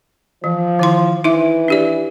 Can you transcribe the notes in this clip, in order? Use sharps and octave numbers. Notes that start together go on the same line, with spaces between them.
E3 F3
D#3 E4 C6
E3 D#4 E4 E5
D4 G4 D5